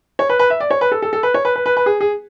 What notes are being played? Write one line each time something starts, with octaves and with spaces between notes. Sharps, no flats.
C#5
B4
B4
E5
D5
C#5
B4
A4
A4
A4
B4
C#5
B4
B4
B4
B4
G#4
G#4